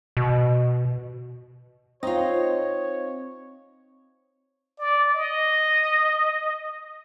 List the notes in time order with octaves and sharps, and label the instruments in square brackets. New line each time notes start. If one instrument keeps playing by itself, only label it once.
[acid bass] B2
[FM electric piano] C4 D#5 [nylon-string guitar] D#4 F4 [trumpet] C#5
[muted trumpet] D5
D#5